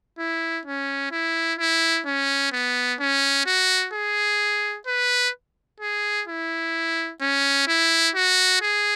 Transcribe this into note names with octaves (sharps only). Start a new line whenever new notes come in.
E4
C#4
E4
E4
C#4
B3
C#4
F#4
G#4
B4
G#4
E4
C#4
E4
F#4
G#4